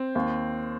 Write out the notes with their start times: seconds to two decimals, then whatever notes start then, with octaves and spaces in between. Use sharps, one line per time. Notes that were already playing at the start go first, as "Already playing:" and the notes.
Already playing: C4
0.15 D#2